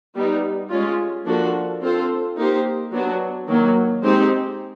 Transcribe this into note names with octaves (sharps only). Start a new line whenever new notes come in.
G3 B3 D#4
G#3 C#4 F4
F3 A#3 D4 F#4 A4
C4 F4 A4 C5
A#3 D#4 G4 C5
F#3 B3 D4 F#4
D#3 F#3 A#3
G#3 C4 D#4 G4 C5